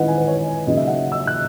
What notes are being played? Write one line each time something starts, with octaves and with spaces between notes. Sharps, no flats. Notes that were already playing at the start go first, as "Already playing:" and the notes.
Already playing: D#3 G#3 C#4 E4 B4 D#5 F#5
G#5
B4
C#5
C#3 F#3 A#3 D#4 D#5
E5
F#5
E6
F#6